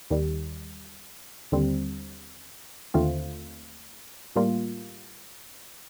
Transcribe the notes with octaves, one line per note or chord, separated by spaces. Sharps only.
D#2 D#3 G3
D#2 D3 G3 C4
D#2 D3 A3 C4 F4
A2 G3 A#3 F4